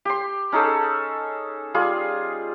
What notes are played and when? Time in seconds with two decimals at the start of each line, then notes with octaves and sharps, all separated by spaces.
0.05 G4 C6
0.52 C#4 D#4 G#4 A4
1.74 G3 F4 G#4